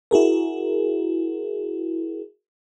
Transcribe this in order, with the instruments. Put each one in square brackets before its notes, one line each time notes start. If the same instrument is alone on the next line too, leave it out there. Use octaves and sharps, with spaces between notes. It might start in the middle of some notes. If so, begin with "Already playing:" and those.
[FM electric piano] E4 F#4 G#4 A#4